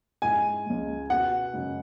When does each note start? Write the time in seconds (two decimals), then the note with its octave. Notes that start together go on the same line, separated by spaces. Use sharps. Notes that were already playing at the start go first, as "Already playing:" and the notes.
0.22 G#2 G#3 E4 G#5
0.66 C#2 C#3 G#3
1.10 B2 B3 F#4 F#5
1.54 F#2 C#3 G#3